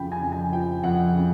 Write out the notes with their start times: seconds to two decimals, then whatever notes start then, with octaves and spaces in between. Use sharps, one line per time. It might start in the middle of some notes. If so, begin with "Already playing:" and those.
Already playing: F2 C#3 F3 G5 B5
0.12 G#5
0.22 F2
0.32 G#5
0.52 F3 G5
0.83 F2 F#5
1.14 C#3